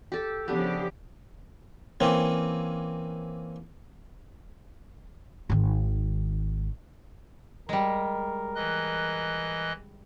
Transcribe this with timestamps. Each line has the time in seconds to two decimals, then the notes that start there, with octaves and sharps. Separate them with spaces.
0.12 G4 A4
0.48 C#3 F3 B3 D4 G4
2.00 E3 A#3 C4 C#4
5.50 G#1 D#3
7.69 G3 G#3 A#4
8.55 E3 D#5 F#6